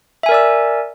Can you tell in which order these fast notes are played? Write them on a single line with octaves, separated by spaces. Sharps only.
E5 G#5 A#4 D5 E6